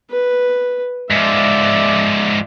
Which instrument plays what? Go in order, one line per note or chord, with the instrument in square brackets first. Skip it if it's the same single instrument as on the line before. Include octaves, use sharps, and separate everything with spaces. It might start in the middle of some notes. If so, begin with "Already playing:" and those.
[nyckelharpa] B4
[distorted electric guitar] G#2 F3 [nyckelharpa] D5 E5